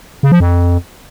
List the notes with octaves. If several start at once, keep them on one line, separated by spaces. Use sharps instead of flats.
C#3
F3
F2